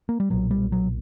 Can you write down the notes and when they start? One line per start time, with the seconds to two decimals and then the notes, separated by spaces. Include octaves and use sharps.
0.09 A#3
0.20 G3
0.30 B1 A#2 F#3
0.51 G3
0.72 F#3